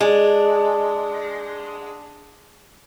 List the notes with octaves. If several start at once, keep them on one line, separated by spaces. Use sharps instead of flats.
G#3 D4